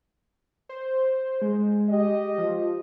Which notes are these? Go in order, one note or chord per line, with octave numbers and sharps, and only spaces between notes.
C5
G#3
G4 D#5
F3